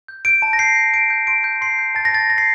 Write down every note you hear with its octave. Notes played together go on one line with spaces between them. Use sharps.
G6
G6 D7
A5
A#6
G6 C7
G6
G6 D7
G6
C6 D7
G6
C6 C7
G6
A5 A6
A#6
A5 A6
A5 A#6
C7